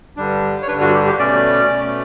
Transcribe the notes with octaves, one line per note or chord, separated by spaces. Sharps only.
G2 D3 G3 D4
C#5
G2 D3 G3 D4 B4
F#4
G4
G4
B2 A3 C#4 D5
B2 A3 C#4